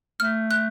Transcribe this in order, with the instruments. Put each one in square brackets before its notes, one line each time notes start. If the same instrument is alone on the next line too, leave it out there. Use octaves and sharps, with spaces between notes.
[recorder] A3 [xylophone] F6
[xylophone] F#6